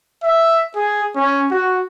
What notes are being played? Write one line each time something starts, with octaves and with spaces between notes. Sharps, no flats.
E5
G#4
C#4
F#4